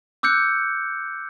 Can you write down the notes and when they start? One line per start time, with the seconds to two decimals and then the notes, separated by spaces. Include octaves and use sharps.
0.23 D6 E6 F#6 G6 C#7